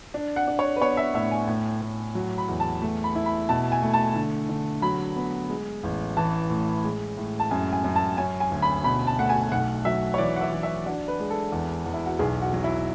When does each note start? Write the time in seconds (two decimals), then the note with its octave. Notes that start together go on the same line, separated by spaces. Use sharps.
0.14 D4
0.36 F#5
0.47 D4
0.59 C#5
0.76 B4
0.81 B3 C#5
0.97 E5
1.14 A2 E5
1.31 G#5
1.48 A2
1.81 A2
2.15 F#3
2.38 B5
2.48 E2
2.60 A5
2.82 A3
3.04 B5
3.15 E4
3.26 B5
3.49 B2 A5
3.72 G#5
3.82 A3
3.94 A5
4.16 D3
4.49 D3
4.82 F#3 B5
5.16 B3
5.50 G#3
5.83 A1
6.17 E3 A5
6.50 A2
6.84 G#3
7.18 A2
7.40 A5
7.51 F#2 G#5
7.73 G#5
7.84 F#2
7.96 A5
8.17 C#4 G#5
8.40 G#5
8.52 D2
8.62 B5
8.84 B2 B5
9.07 A5
9.19 A3 F#5
9.29 G#5
9.52 B1 F#5
9.85 F#3 E5
10.14 C#5
10.18 E3 D5
10.36 F#5
10.41 E5
10.52 E3
10.63 E5
10.86 D4 F#4
11.08 B4
11.20 G#3
11.31 A4
11.52 E2
11.86 E2
11.94 E4
12.06 F#4
12.19 B1 G#4
12.41 F#4
12.53 F#3
12.64 E4